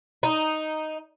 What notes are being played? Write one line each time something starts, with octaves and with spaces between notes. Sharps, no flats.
D#4